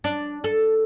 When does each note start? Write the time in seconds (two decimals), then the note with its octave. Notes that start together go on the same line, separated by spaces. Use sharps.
0.04 D4
0.44 A4